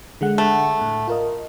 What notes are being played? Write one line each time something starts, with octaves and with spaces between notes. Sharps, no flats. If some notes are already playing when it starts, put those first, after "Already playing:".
D3 G#3 F#5
A3
A2
F4 A#4 D#5